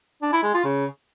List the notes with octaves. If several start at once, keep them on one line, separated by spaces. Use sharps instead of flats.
D4
E4
G#3
F4
C#3